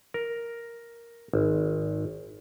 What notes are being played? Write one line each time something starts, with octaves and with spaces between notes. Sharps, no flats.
A#4
G#1